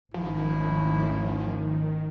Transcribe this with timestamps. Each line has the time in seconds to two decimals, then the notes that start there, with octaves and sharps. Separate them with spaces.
0.14 G#1 D2 D#3 F3 C#4 E4